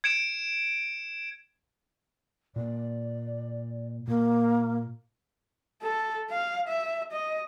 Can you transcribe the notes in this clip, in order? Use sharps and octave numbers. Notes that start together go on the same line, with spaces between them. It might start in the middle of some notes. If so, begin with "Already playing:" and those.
G#6 C#7 D7 E7
A#2 A#3 D5
A#2 A#3
A4
F5
E5
D#5